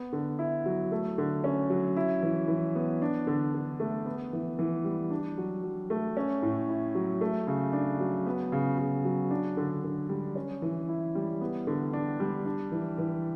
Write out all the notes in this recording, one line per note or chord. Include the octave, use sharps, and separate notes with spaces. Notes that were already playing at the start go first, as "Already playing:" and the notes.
Already playing: B3
D3
E4
F#3
A3
D3
C#4
F#3
E4
E3
E3
B3
D4
D3
D3
A3
B3
E3
E3
G3
D4
F#3
F#3
A3
C#4
A2
E4
F#3
A3
C#3
D4
F#3
B3
C#3
C#3
F#3
D4
D3
D3
G3
C#4
E3
E4
G3
B3
D3
D4
G3
D4
E3
E3